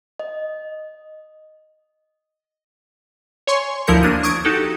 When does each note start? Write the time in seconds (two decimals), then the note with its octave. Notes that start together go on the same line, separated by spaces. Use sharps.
0.19 D#5
3.47 C#5 G#5 C6 C#6
3.87 D2 F3 E4 A#4 G6 C#7
4.03 A#3 D4 D#7
4.23 C#6 D#6 G#6 D7
4.45 D#4 F#4 G4 A4